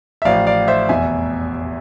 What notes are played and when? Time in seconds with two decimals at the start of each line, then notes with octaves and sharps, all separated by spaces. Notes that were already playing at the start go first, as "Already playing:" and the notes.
0.22 E5
0.25 A1 A2 F3 D5 F5
0.47 D5 F5
0.68 C5 E5
0.89 F1 E2 B2 E5 G#5